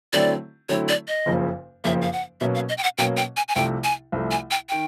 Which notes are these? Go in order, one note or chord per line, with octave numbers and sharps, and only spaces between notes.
D3 F#3 A3 C4 E4 D5
D3 F#3 A3 C4 E4 C#5
D5
D#5
F#1 F2 C#3 F3 A#3
F#1 F2 C#3 F3 A#3 E5
F5
F#5
B2 F#3 A#3 C#4 E5
F5
D#5
G5
F#5
B2 F#3 A#3 C#4 G5
G5
G#5
G#5
C2 C3 F3 A3 G5
G#5
C2 C3 F3 A3
G#5
G5
D#3 G5